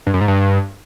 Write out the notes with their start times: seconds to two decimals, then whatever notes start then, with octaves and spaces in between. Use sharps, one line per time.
0.07 G2
0.14 F#2
0.21 G#2
0.28 G2